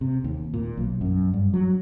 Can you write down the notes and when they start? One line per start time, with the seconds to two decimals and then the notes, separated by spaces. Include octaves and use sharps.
0.01 C3
0.24 D#2
0.54 A#2
0.77 B1
1.01 F#2
1.34 G2
1.54 F#3